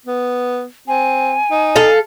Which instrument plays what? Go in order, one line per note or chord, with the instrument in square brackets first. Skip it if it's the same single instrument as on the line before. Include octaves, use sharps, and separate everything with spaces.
[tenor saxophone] B3
[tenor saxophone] C4 [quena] G#5
[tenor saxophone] D#4
[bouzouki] A4 F5